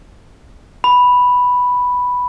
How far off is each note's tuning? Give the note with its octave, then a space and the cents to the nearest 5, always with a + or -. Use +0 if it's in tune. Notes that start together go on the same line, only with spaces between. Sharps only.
B5 +0